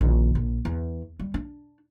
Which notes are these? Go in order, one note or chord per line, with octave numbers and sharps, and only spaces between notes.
A#1 D#3
A#1
E2
G3
D4